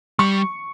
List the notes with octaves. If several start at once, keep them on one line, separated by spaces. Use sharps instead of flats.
G3 C#6